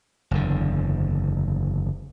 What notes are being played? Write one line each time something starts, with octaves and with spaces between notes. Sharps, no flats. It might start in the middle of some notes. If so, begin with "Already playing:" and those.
F#1 E2 D3